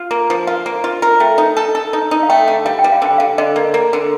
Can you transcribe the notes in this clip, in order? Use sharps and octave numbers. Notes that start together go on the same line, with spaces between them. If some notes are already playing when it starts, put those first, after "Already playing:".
Already playing: F4
A#3
F3
F4 F5
A#3
F4
A#4
A3 G5
D#4
A4 A5
A4
D#4
D#4
F5
A3 G5
D3
G3 F5
G5
G3
F5
D3 G5
D3 F5
D3 D#5
A#3
A#3
D3